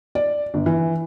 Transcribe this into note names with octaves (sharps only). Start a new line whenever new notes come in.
D5
G1
E3